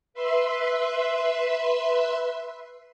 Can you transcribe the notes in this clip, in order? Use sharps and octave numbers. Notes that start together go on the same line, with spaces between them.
B4 E5 C6